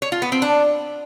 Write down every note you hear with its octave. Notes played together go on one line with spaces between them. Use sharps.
C#5
F4
B3
C4
D4